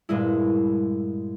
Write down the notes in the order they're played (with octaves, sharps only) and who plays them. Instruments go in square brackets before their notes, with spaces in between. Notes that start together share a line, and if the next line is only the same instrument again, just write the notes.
[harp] G2 A#2 G#3 E4